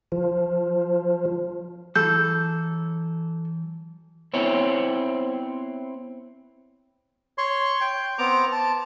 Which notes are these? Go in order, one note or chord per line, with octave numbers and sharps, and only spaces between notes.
F3
E3 F#3 A4 G6
B3 C4 E4 C#5
C#5 C6
G5
B3 C4 A#5 D6
A5